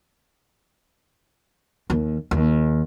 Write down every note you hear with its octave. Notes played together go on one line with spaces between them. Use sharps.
D#2
D#2